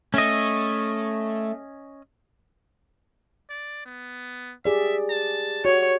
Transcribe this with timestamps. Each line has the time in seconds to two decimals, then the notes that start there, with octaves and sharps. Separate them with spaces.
0.14 A3 C#4 D#5
3.50 D5
3.86 B3
4.65 G4 G#4 D5 E5
5.10 A5
5.65 F#4 C#5